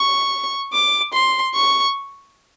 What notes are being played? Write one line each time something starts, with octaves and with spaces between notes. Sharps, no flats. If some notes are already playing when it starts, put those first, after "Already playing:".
Already playing: C#6
D6
C6
C#6